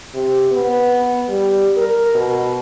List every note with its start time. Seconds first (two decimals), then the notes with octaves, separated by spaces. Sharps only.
0.15 C3
0.52 B3
1.28 G3
1.77 A#4
2.15 B2